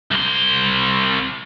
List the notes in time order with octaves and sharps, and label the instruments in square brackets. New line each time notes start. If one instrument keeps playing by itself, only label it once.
[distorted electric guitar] C2 C6